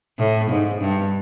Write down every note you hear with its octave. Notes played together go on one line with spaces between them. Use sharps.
A2
G#2
G2